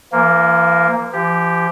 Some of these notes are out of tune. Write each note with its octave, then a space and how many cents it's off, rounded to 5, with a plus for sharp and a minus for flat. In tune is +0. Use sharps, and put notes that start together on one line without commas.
E3 +45 A#3 +0
F3 -40 G4 +0